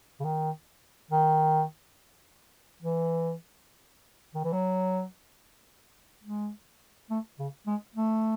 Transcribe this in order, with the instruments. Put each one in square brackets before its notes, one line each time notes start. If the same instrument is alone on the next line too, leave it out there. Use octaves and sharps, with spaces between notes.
[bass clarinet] C#3
D#3
D#3
E3
D#3
E3
F#3
G#3
A3
C#3
G#3
A3